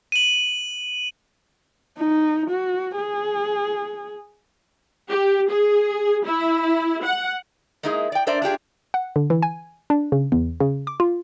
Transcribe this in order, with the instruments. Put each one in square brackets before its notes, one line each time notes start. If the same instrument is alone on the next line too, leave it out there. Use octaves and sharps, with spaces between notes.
[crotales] D#7 F#7
[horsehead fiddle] D#4
F#4
G#4
[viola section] G4
G#4
E4
F#5
[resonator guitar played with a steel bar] G#3 A#3 D#4 E4 G#4
D5 G5
D4 A#4 C5 D5 E5
D4 F4 G4 G#4
[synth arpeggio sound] F#5
D3
E3
G#5
D4
C#3
E2
C#3
D6
F4